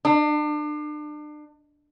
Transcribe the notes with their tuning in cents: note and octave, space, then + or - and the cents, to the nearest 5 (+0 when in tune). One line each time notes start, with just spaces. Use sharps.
D4 +35